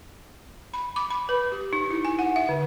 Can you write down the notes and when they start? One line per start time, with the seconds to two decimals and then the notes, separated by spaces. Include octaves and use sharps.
0.74 B5
0.96 D6
1.10 B5
1.29 B4
1.52 G4
1.73 D#4
1.91 E4
2.05 G#5
2.19 F#5
2.36 E5
2.49 D3